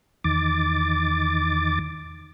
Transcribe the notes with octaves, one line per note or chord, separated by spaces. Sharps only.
E2 D#3 D6 A6